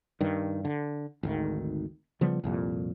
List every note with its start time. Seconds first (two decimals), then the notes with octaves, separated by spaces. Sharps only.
0.21 G2 D#3
0.65 D3
1.23 G#1 D2 D#3
2.21 C#3 F3 G3 B3
2.44 C2 F2 A#2